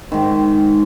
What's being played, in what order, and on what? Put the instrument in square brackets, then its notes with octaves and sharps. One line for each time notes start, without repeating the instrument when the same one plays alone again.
[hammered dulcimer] G#2 D#3